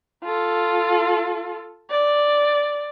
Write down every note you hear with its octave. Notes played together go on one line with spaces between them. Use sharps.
F4 A4
D5